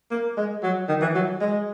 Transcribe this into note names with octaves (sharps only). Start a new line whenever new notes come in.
A#3
G#3
F#3
D#3
E3
F#3
G#3